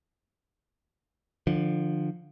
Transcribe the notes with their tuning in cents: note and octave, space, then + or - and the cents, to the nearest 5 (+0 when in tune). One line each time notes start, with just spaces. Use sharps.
D3 +25 F3 +0